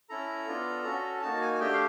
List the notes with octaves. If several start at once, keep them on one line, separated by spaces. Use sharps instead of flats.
C#4 E4 A4 A#5
B3 D4 F4 A4
C#4 F#4 A4
A#3 D#4 F#4 A5
G#5
G#5
A3 D4 G4 G5
F5